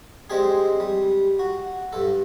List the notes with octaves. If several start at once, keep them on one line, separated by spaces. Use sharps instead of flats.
G#3 C4 D4 G4 G#4
G3
F#4
G2 A4